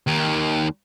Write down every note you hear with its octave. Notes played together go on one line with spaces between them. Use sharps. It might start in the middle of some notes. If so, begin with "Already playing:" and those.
D#2 D#3